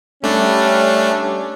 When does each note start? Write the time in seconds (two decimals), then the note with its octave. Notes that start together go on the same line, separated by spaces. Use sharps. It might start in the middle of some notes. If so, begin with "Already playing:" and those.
0.23 G3 A3 C#4 D4